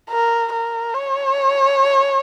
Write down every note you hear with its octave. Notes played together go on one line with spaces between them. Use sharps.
A#4
A#4
C#5